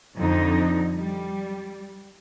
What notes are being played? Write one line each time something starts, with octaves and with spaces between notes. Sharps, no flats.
F2 D3 D#4
G3